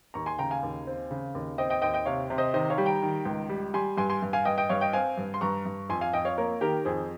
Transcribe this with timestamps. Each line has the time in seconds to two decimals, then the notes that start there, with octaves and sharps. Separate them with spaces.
0.14 D#2 A#5 C#6
0.26 G#5 C6
0.38 C#3 G5 A#5
0.50 F5 G#5
0.63 D#2
0.87 C4
1.11 C#3
1.35 D#2
1.58 C4 D#5 G5
1.70 D#5 G5
1.82 D#2 D#5 G5
1.94 D#5 G5
2.06 C3 C#5 F5
2.30 C3
2.38 C5 D#5
2.54 D#3 C5 D#5
2.70 C#5 F5
2.78 G3
2.86 G5 A#5
3.02 D#3
3.25 C#2
3.49 G3
3.74 G3 G#5 C6
3.97 G2 G#5 C6
4.10 G#5 C6
4.22 G2
4.33 F5 G#5
4.45 G2 D#5 G5
4.58 D#5 G5
4.69 G2 C#5 F5
4.81 D#5 G5
4.93 C4 F5 G#5
5.17 G2
5.34 C6
5.41 G2 A#5 C#6
5.65 G2
5.89 F2 G#5 C6
6.01 F5 G#5
6.13 F2 D#5 G5
6.25 C#5 F5
6.37 A#3 A#4 C#5
6.61 D#3 G4 A#4
6.85 F2 G#4 C5